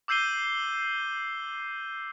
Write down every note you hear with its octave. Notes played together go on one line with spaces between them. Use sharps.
D6 E6 G6 C7 D#7 G7